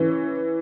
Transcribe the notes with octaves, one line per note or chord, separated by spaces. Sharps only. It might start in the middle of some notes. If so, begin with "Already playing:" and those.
Already playing: E3 C#4